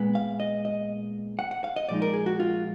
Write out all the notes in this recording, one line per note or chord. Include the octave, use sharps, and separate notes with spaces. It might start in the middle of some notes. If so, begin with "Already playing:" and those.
Already playing: A#2 G#3 B3
F5
D#5
D#5
F#5
F#5
F5
D#5
A#2 F3 G#3 D#4 D5
A#4
G#4
F#4
F4